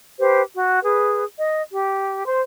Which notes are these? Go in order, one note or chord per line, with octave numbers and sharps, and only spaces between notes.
G4 B4 C5
F#4
G#4 B4
D#5
G4
C5 C6